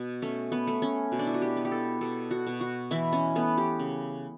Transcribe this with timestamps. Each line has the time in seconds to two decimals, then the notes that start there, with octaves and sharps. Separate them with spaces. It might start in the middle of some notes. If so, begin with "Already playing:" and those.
Already playing: B2
0.22 A3 C#4
0.52 B3
0.67 A3
0.82 C#4
1.12 B2
1.19 D4
1.27 E4
1.34 F#4
1.42 G4
1.57 B3
1.65 G4
1.71 A4
2.01 B2 A4
2.31 F#4
2.47 B2
2.61 F#4
2.91 E3 E4
3.13 C#4
3.36 A3 B3
3.58 G4
3.79 C#3